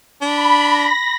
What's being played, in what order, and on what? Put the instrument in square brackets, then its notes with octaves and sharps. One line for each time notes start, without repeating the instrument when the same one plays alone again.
[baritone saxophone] D4 [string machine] B5
[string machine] A#6